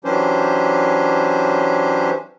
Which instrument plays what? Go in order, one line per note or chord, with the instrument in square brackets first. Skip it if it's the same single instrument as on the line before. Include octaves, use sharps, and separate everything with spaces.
[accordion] E3 F#3 C#4 D4 G4 C5